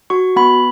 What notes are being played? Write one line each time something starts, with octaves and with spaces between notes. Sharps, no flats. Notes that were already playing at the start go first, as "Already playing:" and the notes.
F#4 C#6
B3 B5